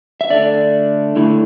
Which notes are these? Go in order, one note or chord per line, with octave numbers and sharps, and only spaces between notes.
E5
D3 A3 D4 D5
D3 A3 E4